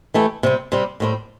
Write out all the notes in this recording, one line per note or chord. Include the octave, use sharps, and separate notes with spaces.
E3 A3 E4 G4
C3 G3 C4
C3 G3 C4
A2 G3 C4